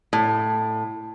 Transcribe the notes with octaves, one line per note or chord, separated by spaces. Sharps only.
A2